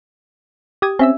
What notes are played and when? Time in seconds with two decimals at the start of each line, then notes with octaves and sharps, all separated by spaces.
0.82 G4 D#6 G#6
0.99 C4 C#4 E5 E6